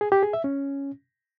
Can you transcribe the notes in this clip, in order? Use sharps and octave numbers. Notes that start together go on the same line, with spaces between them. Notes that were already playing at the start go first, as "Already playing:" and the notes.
G#4
G4
G#4
E5
C#4